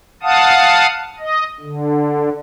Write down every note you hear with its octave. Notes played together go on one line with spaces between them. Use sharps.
F5 F#5 A5 D#6
D#5
D3